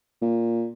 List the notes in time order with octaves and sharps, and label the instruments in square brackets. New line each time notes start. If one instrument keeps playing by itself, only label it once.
[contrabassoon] A#2